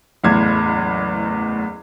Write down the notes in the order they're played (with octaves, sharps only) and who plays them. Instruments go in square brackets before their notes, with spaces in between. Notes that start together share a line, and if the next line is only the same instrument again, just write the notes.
[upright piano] F#1 E2 A2 G#6